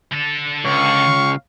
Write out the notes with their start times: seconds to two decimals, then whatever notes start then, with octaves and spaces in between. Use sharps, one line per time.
0.12 D3 A4
0.65 C#2 F5 C#6